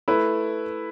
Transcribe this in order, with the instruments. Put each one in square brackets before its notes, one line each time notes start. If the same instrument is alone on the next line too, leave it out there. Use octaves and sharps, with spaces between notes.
[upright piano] A3 E4 B4